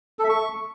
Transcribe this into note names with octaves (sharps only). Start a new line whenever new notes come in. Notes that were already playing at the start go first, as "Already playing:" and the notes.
A4
E5
C#6